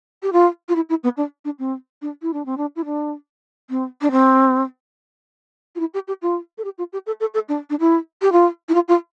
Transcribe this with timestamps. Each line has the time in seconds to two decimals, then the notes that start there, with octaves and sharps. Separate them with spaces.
0.23 G4
0.33 F4
0.69 F4
0.75 E4
0.89 E4
1.04 B3
1.17 D4
1.45 D4
1.59 C4
2.02 D4
2.22 E4
2.33 D4
2.46 C4
2.57 D4
2.76 E4
2.85 D4
3.70 C4
4.01 D4
4.11 C4
5.75 F4
5.80 E4
5.94 G4
6.08 G4
6.22 F4
6.58 A4
6.64 G4
6.78 F4
6.93 G4
7.06 A4
7.20 A4
7.34 A4
7.49 D4
7.70 D4
7.80 E4
8.22 G4
8.32 F4
8.69 E4
8.74 F4
8.88 F4